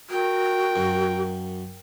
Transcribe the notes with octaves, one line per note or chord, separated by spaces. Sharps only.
F#4 A#4 G5
F#2